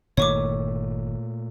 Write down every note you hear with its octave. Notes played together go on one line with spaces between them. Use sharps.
G1 A#2 D#3 A3 C#5 C#6 D6